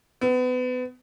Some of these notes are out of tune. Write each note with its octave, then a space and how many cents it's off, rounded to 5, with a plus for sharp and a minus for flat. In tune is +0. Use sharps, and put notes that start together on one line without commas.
B3 +30